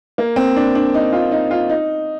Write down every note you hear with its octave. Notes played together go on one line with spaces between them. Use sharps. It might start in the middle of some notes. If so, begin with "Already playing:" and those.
A#3
C4
D4
D4
D#4
F4
D#4
F4
D#4